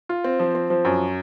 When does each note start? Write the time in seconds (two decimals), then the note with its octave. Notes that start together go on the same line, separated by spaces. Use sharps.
0.09 F4
0.24 C4
0.39 F3
0.55 C4
0.70 F3
0.85 F#2